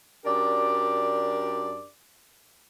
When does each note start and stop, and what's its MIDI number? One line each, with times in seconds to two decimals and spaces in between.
0.25 1.87 42
0.25 1.87 62
0.25 1.87 67
0.25 1.87 70
0.25 1.87 74